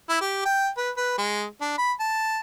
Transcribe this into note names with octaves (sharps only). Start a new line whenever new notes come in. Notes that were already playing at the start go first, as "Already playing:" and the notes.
E4
G4
G5
B4
B4
G#3
D4
B5
A5